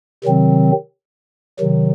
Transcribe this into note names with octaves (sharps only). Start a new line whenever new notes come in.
C3 D#3 F#3 C4
C3 D#3 F#3